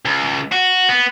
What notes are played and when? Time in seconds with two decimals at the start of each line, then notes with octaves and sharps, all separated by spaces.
0.05 C#2
0.52 F#4
0.89 B3